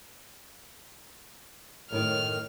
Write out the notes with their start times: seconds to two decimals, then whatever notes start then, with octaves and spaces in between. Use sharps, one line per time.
1.91 F#2 A2 D#3 F6